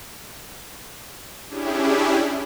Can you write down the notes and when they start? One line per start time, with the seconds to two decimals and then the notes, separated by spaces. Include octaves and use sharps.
1.49 C#4 D4 E4 G4 G#4